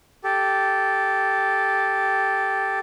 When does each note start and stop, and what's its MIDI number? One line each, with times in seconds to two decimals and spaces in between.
0.24 2.79 67
0.24 2.79 69